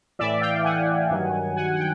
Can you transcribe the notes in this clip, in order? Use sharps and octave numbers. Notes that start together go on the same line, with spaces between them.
A2 E3 D5 E5
F5 G5
F#5 G#5
G2 D#3 F#3
F#5 G#5
F#5
G5